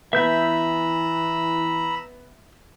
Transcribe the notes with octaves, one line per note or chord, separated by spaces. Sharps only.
E3 B3 E5 A#5 B5 E6 G6